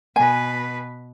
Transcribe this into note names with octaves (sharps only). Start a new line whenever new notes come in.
B2 B4 G#5